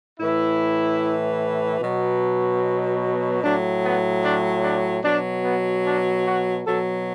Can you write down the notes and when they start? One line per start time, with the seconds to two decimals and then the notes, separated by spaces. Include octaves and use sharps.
0.20 A2 E3 E4
1.80 B2 F#3
3.43 A2 F#3 D4
3.83 B3
4.24 D4
4.63 D4
5.03 B2 F#3 D4
5.44 B3
5.85 D4
6.25 F#4
6.65 B2 F#3 A4